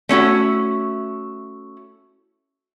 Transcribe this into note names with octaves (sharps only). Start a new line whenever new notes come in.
A3 C#4 E4 F#4